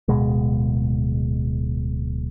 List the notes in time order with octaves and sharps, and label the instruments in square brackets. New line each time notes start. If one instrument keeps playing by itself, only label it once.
[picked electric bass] D1 B2 G#3